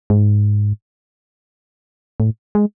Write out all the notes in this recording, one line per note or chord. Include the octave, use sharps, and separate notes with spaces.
G#2
A2
G#3